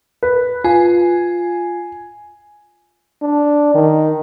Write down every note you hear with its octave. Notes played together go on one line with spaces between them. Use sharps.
B4
F4 G#5
D4
D#3